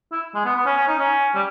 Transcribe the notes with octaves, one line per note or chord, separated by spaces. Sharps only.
E4
G#3
B3
B3
C#4
C#4
D#4
C#4
G3